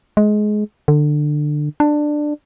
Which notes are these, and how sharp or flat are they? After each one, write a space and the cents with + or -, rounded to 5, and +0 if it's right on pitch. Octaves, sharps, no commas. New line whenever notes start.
G#3 +20
D3 +20
D4 +15